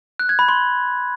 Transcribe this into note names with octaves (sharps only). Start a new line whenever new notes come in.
F#6
G#6
B5
C6